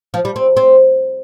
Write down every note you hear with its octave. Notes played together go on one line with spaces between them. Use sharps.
F3
G3
C4
C4